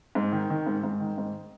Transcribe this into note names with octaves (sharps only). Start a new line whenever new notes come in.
G#2
D#3
D#3
G#2
G#2
D#3
G#2